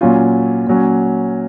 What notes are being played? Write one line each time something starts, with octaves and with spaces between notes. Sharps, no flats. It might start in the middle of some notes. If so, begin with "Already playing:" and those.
A#2 F#3 C#4 F4
A#2 F#3 C#4